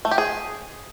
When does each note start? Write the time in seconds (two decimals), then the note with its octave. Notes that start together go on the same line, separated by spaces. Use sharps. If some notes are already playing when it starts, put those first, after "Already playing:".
0.05 A3
0.11 G4
0.18 G#4